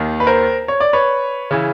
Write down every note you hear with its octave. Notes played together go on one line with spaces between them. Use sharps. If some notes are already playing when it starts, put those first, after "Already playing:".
Already playing: D#2 D#3
B4
A#4 C5
C#5
D5
B4 C#5
C#3 E3